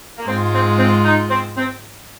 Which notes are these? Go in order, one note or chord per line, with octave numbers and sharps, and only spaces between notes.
A#3
G#2 G#3 C4 F4
C4
C4
D#4
C4
C4